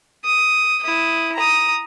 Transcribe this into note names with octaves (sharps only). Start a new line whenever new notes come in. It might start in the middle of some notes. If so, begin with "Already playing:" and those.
D#6
E4 D#6
A#5 D#6